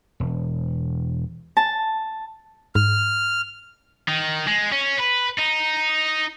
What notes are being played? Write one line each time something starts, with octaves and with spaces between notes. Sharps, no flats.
E1
A5
G#2 F6
D#3
G#3
C#4
B4
D#4